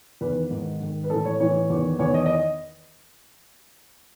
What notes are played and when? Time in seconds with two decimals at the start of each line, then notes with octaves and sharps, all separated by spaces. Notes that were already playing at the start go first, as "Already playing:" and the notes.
0.21 E2 D#3 B4
0.51 G#2 D#3
0.80 G#2 D#3
1.04 B4
1.10 A2 E3 A4
1.25 C#5
1.40 A2 E3 C#5
1.70 E2 D#3
1.99 E2 D#3 C#5
2.14 D#5
2.26 D#5